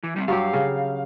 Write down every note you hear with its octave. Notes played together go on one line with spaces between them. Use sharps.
E3
G3 B3 C4
G2 F#3 G4 F5
C#3